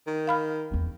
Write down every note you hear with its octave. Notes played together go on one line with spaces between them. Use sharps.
D#3
F5 B5 F6
E2 C#4